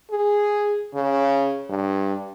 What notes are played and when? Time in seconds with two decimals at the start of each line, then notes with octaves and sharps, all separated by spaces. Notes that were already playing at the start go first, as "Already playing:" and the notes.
0.11 G#4
0.95 C#3
1.70 G2